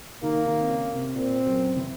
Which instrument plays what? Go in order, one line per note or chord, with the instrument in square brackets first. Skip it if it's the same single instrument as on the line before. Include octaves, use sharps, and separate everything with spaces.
[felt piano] D#3 D#4 [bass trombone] A#3
[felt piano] D#3 D#4
C4
C#3 C#4
C3 C4
[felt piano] A#2 A#3 [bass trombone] C4
[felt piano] F#2 F#3
E3